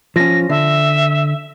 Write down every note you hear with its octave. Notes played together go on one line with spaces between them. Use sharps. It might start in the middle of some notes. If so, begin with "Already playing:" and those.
F3 C#4 A#6
D3 E5